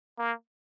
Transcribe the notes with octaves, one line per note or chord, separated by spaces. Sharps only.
A#3